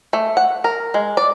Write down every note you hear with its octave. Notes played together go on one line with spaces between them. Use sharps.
A3
F#5
A#4
G#3
D5